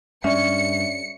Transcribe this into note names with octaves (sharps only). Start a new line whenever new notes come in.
G2 C#4 D5 E5 C#7